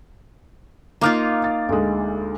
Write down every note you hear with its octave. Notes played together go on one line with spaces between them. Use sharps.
A#3 D#4 F4 A#5 D6 F6
A6
D2 G#3